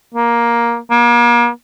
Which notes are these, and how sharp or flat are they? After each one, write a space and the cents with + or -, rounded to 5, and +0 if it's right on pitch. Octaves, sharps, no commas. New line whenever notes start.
A#3 +10
A#3 +40